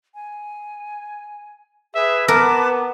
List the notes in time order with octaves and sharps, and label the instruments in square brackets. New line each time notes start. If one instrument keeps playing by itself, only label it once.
[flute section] G#5
[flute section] G#4 B4 [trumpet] E5
[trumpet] B3 [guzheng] A#4 [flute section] B4 A5 D6